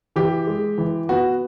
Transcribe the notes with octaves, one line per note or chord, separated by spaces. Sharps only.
E3 G4
G#3
E3
B3 F#4